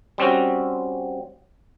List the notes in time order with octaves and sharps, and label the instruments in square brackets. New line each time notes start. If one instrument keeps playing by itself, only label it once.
[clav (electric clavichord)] G3 C4 C#4 F#4